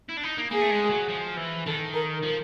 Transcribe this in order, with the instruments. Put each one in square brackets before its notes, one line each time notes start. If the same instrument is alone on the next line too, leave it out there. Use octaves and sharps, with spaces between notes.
[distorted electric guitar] E4
D4
D#4
A#3
[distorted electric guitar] A#3 [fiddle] G#4
[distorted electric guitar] A3
G#3
F#3
F3
E3
[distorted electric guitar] D#3 [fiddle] A4
[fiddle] A#4
[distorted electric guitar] F3